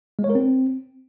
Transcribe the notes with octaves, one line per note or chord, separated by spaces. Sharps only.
G#3
C#5
A#4
C4